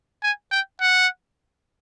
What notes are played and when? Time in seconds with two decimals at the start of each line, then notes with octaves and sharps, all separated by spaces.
0.23 G#5
0.51 G5
0.81 F#5